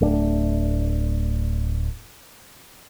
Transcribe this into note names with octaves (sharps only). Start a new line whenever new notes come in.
D1 A3 D4